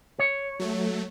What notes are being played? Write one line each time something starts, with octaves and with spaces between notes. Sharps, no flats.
C#5
F#3 A3